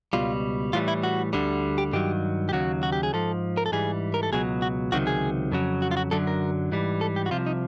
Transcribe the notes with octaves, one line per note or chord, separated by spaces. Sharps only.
C#2 B2 G3 F4
A2 E3 G3 F4
E4
F#4
D2 D3 G3
G4
G2 D#3 F#3 G4
G4
D#2 C#3 F#3 F#4
F#4
G4
G#4
G#2 F3 A4
A#4
A4
G#2 E3 G3 G#4
A#4
A4
C#2 B2 F#3 G#4
F#4
C#2 C3 D#3 F#3 F#4
G#4
F2 C#3 F#3
F#4
F4
F#4
F#2 D3 F#3 A4
A#4
G#2 E3 G3
A4
G4
F#4
C2 C3 F3 F4
D#4